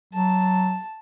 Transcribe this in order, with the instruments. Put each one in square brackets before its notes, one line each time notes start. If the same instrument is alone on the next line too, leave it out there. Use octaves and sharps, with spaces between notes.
[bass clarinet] F#3 [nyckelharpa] A5